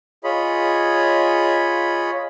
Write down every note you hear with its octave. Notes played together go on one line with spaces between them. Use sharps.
F4 G#4 C#5 D#5 B5